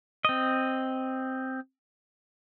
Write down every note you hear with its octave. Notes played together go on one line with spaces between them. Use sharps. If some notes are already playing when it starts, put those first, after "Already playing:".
C4 D#5